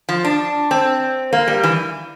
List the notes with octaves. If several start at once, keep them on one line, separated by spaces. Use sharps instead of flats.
F3
D4
C4
A#3
G3
E3